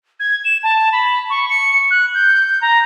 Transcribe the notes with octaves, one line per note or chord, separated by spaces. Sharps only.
G#6
E7
A5
B5
C#6
C#7
F#6
G6
A#5